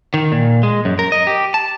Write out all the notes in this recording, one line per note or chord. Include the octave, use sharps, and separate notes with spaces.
D#3
A#2
G#3
F#2
A#4
D#5
G4
A5